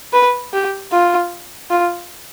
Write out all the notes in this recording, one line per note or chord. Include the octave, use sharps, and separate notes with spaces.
B4
G4
F4
F4